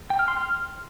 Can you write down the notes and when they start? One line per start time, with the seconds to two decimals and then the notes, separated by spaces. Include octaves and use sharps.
0.10 G5
0.19 F6
0.28 C6
0.37 F6